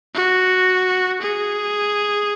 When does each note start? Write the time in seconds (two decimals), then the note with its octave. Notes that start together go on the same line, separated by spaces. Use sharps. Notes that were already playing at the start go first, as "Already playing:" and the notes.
0.15 F#4
1.22 G#4